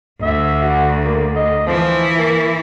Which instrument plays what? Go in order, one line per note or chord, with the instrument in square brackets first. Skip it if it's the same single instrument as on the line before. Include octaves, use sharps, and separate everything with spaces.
[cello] D2 [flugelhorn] E5
[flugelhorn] F#4
A#3
D#5
[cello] E3 E4 [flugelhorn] F3
[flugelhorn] A#3